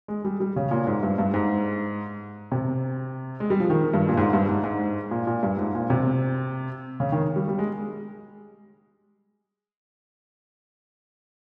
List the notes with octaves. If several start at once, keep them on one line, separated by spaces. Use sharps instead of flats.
G#3
G3
G3
C#3
A#2
G#2
G2
G2
G#2
C3
G#3
G3
F3
D#3
G2
A#2
G#2
G2
G#2
G#2
A#2
A#2
G2
G#2
A#2
C3
C#3
D#3
G3
G3
G#3